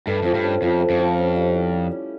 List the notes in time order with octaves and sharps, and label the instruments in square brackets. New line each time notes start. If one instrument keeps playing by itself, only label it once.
[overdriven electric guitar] G2 [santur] A3
[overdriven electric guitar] F2 [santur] F3
[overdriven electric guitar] G2
[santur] C#4
[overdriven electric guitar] F2 [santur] F3
[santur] A3
[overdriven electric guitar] F2
[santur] F3
C#4
G3
E4
G3
C#4